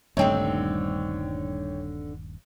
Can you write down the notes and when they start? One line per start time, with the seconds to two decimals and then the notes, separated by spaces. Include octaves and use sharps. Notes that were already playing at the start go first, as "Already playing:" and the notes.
0.17 D#1 G2 D3 A3 C4 D#4 C#5 G5